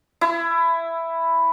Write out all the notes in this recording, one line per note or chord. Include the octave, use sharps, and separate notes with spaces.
E4